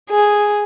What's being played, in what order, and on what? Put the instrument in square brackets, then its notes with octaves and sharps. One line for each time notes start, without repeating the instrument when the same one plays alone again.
[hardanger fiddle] G#4